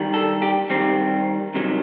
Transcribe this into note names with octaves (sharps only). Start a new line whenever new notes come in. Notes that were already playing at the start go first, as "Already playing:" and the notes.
Already playing: G2 D#3 G3
A4
G4
G2 D#3 G3 C4
C2 C3 D#3 F#3